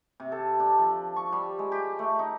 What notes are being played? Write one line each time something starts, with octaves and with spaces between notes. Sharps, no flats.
C3
A4
D4
F3
C#6
G3
G#3
G4
A3
D#4